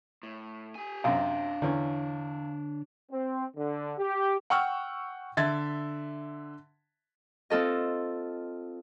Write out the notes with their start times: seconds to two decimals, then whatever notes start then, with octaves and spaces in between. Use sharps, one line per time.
0.23 A2
0.75 G4 G#5
1.04 F#2 C3 D4 C#5 F5
1.62 E2 D3 C#4
3.12 C4
3.56 D3
3.98 G4
4.50 F#5 G5 C#6 E6 F6
5.37 D3 E5 G#6 A6
7.50 C4 F4 A4 D#5